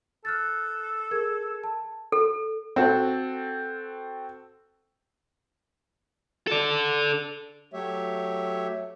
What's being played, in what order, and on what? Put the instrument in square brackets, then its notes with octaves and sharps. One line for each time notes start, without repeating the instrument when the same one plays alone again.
[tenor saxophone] A4 [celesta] F6 F#6 A6
[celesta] G#4 A#4 G#6
A5
[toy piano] A4
[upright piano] C4 F#4 A4
[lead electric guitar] A4 D5
[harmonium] F#3 A3 G4 C#5 E5